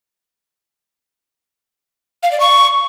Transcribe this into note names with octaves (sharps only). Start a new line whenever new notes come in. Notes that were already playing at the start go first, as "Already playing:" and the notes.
F5
D5
C#6